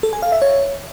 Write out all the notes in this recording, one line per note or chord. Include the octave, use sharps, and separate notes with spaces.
A4
G#5
F5
E5
C#5